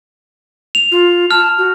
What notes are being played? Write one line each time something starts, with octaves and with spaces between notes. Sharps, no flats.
F7
F4
A5 F6
F#4